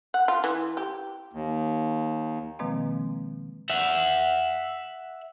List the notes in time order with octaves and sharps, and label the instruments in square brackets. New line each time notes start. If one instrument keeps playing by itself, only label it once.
[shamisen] F#5
F4
E3
G4
[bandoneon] D#2
[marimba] B2 D#3 F3 G#3 A#3 C4
[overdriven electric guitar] E5 F#5